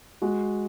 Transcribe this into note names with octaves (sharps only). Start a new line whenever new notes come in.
G#3 F#4